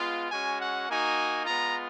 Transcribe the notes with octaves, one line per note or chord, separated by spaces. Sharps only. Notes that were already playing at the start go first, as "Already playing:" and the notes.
Already playing: G#3 B3 F4
G#3 C#4 F#4 G#5
F#5
A#3 D#4 F#4 G#5
G#3 B3 F4 A#5